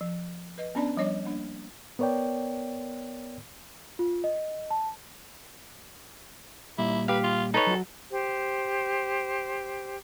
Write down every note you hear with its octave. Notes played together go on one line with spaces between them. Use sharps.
F3
B4 D#5
B3 C#4 D4 D5 A5
F3 G3 D4 C#5 D#5 D6
A#3 D4
B3 A#4 C#5 D5 G5
F4
D#5
A5
A#2 G3 E4
G4 B4 F5
F4
D#4 A4 B4 C#5
F#3 F#4
G4 C5